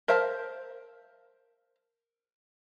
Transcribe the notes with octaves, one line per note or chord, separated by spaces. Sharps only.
A#4 C5 E5 F5 A5